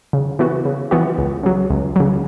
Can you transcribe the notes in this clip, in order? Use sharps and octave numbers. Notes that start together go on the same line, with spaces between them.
C#3
E3 B3 F#4
C#3
E3 B3 F#4
C#2
C#3 F#3
C#2
C#3 F#3